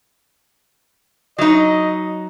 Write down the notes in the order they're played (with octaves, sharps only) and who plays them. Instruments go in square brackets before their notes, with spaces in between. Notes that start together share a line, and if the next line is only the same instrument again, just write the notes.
[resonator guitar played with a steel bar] F#3 D#4 [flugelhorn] D#5